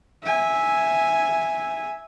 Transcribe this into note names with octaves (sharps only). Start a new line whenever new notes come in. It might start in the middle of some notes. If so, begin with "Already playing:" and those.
E5 G#5